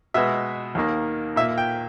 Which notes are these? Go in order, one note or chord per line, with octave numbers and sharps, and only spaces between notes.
B2 G#3 B3 E5
D#2 D#3 A#3
A#2 A#3 E5
G5